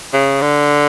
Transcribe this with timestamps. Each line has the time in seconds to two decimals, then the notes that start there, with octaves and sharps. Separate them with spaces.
0.13 C#3
0.42 D3